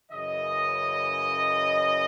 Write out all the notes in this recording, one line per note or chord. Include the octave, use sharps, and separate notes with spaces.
F#2 C#3 E3 D#5